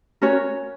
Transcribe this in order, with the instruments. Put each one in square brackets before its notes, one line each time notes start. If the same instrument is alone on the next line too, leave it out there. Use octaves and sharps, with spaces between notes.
[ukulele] C#4 F#4 A#4 C#5